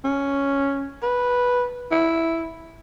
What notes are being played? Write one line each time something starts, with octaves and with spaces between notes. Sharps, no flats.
C#4
B4
E4